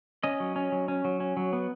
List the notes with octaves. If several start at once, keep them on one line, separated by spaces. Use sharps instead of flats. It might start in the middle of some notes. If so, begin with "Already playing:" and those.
C#4 D#5
F#3
C#4
F#3
C#4
F#3
C#4
F#3
B3